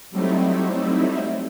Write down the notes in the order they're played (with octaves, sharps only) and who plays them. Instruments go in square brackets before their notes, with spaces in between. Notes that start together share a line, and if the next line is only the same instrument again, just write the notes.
[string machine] F#3 G3 A3 C4 D#4 E4